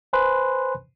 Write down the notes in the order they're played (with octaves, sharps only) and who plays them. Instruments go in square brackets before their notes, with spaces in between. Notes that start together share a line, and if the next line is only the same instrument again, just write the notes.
[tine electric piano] B4 C5 G#5 B5 C6 F#6